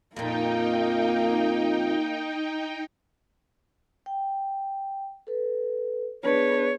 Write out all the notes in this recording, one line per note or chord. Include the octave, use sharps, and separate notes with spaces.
F2 A#2 A#3 D#4 G5
G5
A4 B4
B3 D4 G#4 B4 C#5